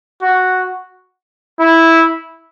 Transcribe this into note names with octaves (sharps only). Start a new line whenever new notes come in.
F#4
E4